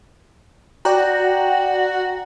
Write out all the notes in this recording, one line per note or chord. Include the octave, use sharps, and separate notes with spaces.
F#4 D5 G5 A#5